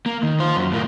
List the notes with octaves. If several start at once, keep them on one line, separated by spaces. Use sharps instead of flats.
A#3
D#3
F4 C5
F#2
A2 A#3